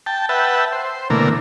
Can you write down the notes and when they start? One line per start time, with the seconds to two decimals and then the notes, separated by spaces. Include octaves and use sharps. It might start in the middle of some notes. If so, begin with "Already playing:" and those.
0.06 G5 A5
0.29 B4 E5 F#5 G5 A5
0.73 C5
1.10 B2 D3 E3 A3 A#3 A#4